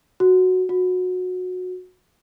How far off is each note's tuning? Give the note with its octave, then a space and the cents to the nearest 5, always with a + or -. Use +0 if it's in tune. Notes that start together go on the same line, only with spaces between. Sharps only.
F#4 -5
F#4 -20